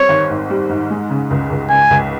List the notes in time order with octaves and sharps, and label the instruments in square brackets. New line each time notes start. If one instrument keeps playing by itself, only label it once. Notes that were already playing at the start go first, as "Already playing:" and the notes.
Already playing: [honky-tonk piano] G3 C4 [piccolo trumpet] C#5
[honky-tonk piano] G#1
G#2
G3
G#2
G#3
C#3
C#2
C#2
[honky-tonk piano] C#3 [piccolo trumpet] G#5
[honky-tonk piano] C#2